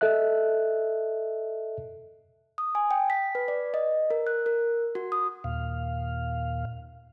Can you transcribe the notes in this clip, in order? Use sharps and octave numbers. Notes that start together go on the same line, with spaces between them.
A4 D#5 E5 F#6
D#6
G#5
G5
B6
B4
D5
D#5
A#4
F#6
A#4
F#4
D#6
D#2 A#2 F5